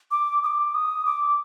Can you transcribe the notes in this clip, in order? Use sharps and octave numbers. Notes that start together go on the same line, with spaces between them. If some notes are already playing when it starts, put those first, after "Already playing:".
D6
D#6
D6
D#6
D6